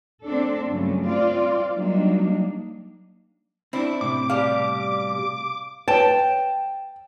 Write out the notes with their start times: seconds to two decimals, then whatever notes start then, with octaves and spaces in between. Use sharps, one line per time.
0.24 A#3 C4 D4 A4
0.68 G2 C#3 F#3 A3
1.05 C4 F4 D5
1.74 F#3 G3 A#3 D4 D#4
3.73 C4 D4 E4
4.01 A2 C3 D6
4.30 B2 G3 F5
5.88 B4 C#5 G5 A5